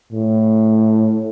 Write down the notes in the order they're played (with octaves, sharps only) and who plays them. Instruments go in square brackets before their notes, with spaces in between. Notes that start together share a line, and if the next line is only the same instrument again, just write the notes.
[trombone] A2